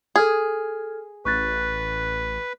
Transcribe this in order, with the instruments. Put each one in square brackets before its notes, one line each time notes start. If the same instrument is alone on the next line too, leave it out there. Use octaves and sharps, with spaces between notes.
[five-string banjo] G#4 [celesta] A4 F6 G#6
[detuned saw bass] A1 [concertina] B4 [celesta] C#6 F#6 A6